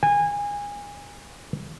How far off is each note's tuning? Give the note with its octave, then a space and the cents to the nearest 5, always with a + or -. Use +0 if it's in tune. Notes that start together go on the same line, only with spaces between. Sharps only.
G#5 -25